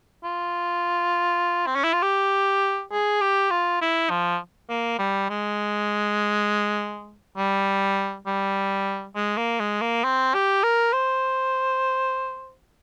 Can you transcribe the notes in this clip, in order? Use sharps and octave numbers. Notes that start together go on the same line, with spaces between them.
F4
C4
C#4
E4
F4
G4
G#4
G4
F4
E4
F3
A#3
G3
G#3
G3
G3
G#3
A#3
G#3
A#3
C4
G4
A#4
C5